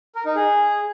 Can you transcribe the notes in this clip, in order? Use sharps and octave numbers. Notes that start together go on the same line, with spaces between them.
A#4
D#4
G#4